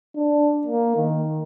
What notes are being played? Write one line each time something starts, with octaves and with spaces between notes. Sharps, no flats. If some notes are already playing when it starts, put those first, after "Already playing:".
D4
A#3
D#3